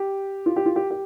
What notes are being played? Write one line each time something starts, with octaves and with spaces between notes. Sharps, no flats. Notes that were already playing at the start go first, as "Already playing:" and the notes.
Already playing: G4
F4
G4
F4
G4
G4